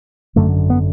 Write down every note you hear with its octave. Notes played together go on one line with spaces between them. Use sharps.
G#1 F#2 D3 A3
B3